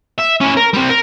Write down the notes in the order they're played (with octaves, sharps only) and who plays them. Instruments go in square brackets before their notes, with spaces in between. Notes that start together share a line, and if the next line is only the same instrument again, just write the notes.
[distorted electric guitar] E5
C#4 E4
A#4
G3 C4
A#4